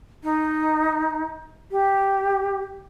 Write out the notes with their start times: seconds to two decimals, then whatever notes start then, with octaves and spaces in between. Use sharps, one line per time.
0.24 D#4
1.71 G4